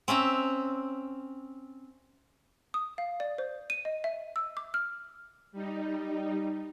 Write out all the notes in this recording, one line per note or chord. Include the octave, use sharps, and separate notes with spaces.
C4 C#4 E5 A#5
D#6
F5
D5
C5
D#7
D#5
E5
E6
D6
F6
G3 D#4